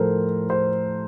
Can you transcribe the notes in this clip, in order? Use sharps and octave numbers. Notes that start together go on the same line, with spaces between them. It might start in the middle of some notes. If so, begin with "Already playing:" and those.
Already playing: A2 F3 A4 A#4 C5
C5